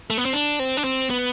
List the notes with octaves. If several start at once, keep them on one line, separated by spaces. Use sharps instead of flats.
A3
B3
C4
D4
C4
D4
C4
B3